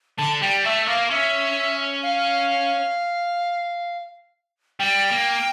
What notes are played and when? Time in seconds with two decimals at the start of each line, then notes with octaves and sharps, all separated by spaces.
0.18 D3 A5
0.41 G3 G5
0.65 A3 E5
0.87 A#3 F5
1.10 C#4 E5
2.03 F5
4.79 G3 G5
5.11 A#3